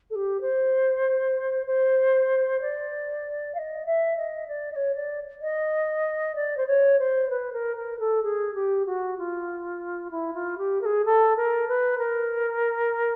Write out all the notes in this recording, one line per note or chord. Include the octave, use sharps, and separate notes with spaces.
A4
G4
C5
C5
D5
F5
D#5
E5
D#5
D5
D#5
C#5
D5
D#5
D5
C5
C#5
C5
B4
A#4
A#4
A4
G#4
G4
F#4
F4
E4
F4
G4
A#4
G#4
A4
A#4
B4
A#4